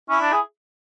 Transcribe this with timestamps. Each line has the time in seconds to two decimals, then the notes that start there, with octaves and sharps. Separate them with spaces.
0.09 C#4 E4
0.21 D4
0.33 G#4